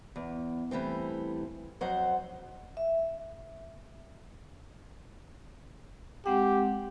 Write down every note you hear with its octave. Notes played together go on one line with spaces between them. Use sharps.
E2
E3 G3 A3 C4
F2 F#3 C5 F#5
E5
G#3 C4 G4 F#5